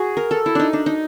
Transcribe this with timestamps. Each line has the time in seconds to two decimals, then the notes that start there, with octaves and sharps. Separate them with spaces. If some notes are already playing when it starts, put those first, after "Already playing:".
Already playing: F#4 G#4
0.17 A#4
0.31 A4
0.46 E4
0.55 D4 D#4
0.73 D4
0.86 D#4